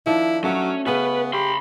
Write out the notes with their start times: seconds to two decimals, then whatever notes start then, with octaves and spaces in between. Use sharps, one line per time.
0.06 D#3 F3 D4 E4
0.44 F#3 A3 C#4 F#4
0.87 C#3 B3 C#4 B4
1.33 G4 B5 C6